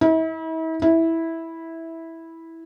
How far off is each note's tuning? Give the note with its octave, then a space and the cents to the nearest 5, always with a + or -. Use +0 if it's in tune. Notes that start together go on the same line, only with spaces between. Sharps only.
E4 -40
E4 -10